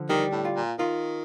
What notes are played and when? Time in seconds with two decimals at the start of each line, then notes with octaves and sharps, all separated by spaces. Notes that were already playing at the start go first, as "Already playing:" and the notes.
Already playing: D3 F3
0.09 D#3 G3
0.32 A2
0.45 F4
0.56 A#2
0.79 D#3 F4